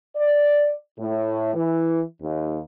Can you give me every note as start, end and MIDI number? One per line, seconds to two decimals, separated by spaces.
0.17 0.74 74
0.99 1.54 45
1.55 2.01 52
2.22 2.59 39